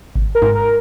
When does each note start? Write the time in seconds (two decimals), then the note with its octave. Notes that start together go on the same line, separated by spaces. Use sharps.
0.16 G#1
0.35 A#4
0.42 G#2
0.55 A#4